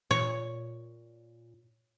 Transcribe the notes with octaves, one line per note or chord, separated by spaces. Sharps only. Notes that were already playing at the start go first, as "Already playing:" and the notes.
A#2 C#5